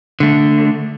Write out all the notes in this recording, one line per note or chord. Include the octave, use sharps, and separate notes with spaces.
D3 A3